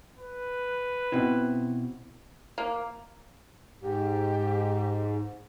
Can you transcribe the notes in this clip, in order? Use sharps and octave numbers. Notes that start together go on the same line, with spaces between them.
B4
B2 C4 E4
A#3
G#2 G4